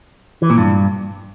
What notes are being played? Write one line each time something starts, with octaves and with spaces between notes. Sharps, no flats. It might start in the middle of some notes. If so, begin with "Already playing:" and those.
E3
A#2
G2